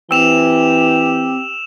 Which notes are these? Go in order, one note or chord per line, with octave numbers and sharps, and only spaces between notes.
E3 C4 G4 C5 G5 E6 E7 F7